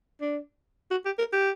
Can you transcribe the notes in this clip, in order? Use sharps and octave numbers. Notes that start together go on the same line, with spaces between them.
D4
F#4
G4
A#4
G4